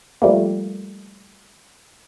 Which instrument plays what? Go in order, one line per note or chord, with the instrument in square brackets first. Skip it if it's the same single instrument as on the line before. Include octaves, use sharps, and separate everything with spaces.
[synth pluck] F3 G3 A3 A#3